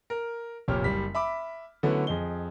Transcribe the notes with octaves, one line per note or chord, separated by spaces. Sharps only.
A#4
F1 A#2 G4 C#5 F6
F#1 G3 B6
E5 B5 D6
D3 F#3 A3 B3 C#4 E4
F2 G#4 D#5 G7